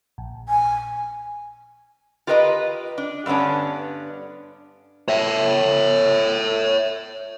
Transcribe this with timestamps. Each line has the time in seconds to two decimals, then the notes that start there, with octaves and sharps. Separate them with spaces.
0.18 A#1
0.49 G#5
2.27 F4 G4 A#4 B4 D5 D#5
2.98 D4
3.26 G2 D3 B3 C#4 D4
5.08 C#5 E5